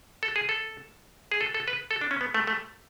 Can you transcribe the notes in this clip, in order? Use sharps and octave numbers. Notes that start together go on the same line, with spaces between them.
A4
G#4
A4
G#4
A4
A4
B4
A4
D4
C#4
B3
A3
A3